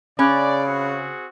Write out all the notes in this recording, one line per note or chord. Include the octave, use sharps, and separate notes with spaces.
C#3 C#4 D5 B5 F#6
C4 F#4 G#4